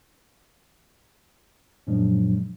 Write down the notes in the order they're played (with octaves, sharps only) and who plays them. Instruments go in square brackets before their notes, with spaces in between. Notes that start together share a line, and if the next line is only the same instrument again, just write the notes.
[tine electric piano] F#2 A#2 F3 F#3 G#3 D4